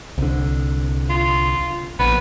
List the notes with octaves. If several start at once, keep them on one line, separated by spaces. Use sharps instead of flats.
C2 D3
F4
A#1 B3